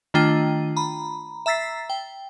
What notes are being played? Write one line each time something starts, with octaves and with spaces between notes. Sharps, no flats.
D#3 A3 D4 F4 G5 D#7
A#5 B5
E5 A#5 E6 A6 B6 C7
G5